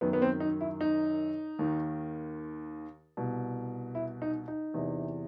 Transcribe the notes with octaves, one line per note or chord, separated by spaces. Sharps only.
F#2 D#3 B3
B3
C4
D#4
E4
D#4
D#2 D#3
C2 B2
E4
D#4
D#4
E2 C3 E3